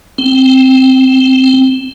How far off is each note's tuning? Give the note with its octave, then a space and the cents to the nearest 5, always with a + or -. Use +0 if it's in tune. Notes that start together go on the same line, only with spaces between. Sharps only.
C4 +0